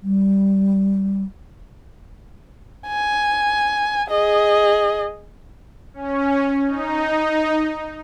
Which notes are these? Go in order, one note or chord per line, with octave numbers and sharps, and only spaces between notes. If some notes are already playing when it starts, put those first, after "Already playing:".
G3
G#5
G#4 D#5
C#4
D#4